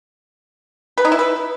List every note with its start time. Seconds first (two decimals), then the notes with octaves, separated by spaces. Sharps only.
0.98 B4
1.05 D#4
1.12 E4
1.19 B4